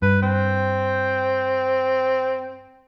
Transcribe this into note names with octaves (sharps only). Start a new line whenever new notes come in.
G2 B4
C4